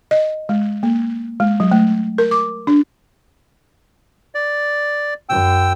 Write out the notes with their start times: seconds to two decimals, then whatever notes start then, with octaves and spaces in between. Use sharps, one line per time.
0.11 D#5
0.49 G#3
0.83 A#3
1.40 G#3
1.60 F#3
1.71 A3
2.18 A#4
2.31 D6
2.67 D4
4.35 D5
5.29 F#2 G5 E6